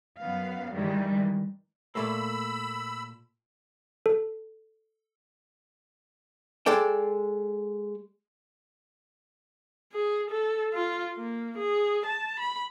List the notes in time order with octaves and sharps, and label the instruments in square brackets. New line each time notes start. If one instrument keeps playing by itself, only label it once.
[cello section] F#2 B3 F5
G2 D#3 E3 G3 G#3
[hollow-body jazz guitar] A#2 A3 A#3 [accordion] B5 E6
[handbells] A4
[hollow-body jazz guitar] G#3 A4 D5 G5
[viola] G#4
A4
F4
A#3
G#4
A5
B5